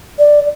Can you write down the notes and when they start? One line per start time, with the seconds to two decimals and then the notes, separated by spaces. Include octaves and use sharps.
0.19 D5